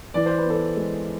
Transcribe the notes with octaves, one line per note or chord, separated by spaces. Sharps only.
E3 D5
C5
B4
B3 A4 C5
G#3